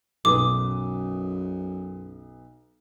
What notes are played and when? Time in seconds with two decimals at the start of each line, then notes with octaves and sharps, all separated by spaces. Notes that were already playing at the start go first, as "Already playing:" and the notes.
0.25 B1 F#2 B4 D6 D#6